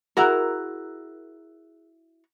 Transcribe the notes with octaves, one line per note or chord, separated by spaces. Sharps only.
E4 F#4 G#4 A#4 A#5 E6 F#6